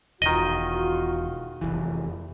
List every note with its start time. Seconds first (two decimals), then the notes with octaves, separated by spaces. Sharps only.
0.22 E1 D#3 F4 F#4 D#5
1.61 F1 C2 E3